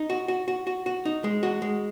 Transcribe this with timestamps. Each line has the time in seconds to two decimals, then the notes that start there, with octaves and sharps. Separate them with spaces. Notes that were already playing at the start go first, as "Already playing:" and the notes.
Already playing: D#4
0.10 F#4
0.28 F#4
0.48 F#4
0.67 F#4
0.86 F#4
1.05 D#4
1.24 G#3
1.43 F#4
1.62 G#3